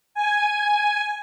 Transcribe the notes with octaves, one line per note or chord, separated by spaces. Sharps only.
G#5